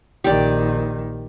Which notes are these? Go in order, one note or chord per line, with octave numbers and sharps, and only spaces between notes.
A#1 D#3 G4 D5